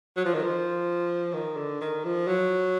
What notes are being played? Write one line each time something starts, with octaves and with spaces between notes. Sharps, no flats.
F#3
F3
D#3
F3
D#3
D3
D#3
F3
F#3